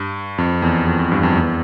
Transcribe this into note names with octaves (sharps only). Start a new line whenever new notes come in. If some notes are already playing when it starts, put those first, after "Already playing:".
Already playing: G2
F2
E2
F2
F2
G2
F2
E2